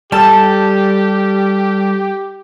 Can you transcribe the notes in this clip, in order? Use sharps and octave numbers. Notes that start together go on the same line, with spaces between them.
G3 G4 A4 A5 E6